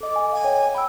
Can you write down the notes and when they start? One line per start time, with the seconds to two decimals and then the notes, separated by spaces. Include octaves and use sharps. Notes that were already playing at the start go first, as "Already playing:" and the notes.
0.01 A4 D#5 D6
0.16 G#5
0.32 F5 G#5
0.44 C#5 G5
0.75 G5 B5 E6